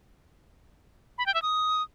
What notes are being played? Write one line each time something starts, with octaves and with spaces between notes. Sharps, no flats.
B5
G5
E5
D#6